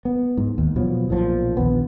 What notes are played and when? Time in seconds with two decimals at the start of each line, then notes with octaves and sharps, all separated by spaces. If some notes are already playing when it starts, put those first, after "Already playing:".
0.05 B3
0.38 G#2
0.58 D#2
0.76 B2 F3 F#3
1.09 B1 A#2 C#3 F3
1.57 A#1 D#2 B3